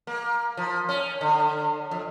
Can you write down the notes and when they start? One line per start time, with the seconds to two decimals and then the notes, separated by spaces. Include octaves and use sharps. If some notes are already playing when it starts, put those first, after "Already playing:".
0.07 A#3
0.57 F3
0.89 C#4
1.21 D3
1.91 F2